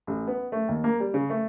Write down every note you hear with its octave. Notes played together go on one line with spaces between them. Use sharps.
A1
B3
A3
D#2
A#3
G3
C#3
A3